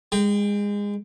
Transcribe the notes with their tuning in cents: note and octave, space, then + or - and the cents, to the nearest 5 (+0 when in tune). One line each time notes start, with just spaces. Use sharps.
G#3 -25 G5 +15